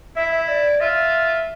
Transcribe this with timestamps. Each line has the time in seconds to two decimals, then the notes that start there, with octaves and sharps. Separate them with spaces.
0.16 E4 E5
0.32 E5
0.49 D5
0.81 F4 E5